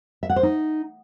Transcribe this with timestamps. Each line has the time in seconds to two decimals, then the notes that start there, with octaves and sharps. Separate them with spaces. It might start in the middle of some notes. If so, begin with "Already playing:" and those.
0.23 E5
0.30 F#5
0.36 C5
0.43 D#4